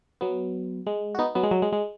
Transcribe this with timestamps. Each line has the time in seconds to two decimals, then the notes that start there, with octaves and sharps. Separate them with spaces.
0.21 F#3 B3
0.87 G#3
1.15 F#4
1.19 B3 D#4
1.35 F#3 B3
1.43 G#3
1.51 F#3
1.62 G#3
1.72 G#3